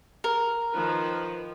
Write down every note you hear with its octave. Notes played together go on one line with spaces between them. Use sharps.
A#4
D#3 F3 B4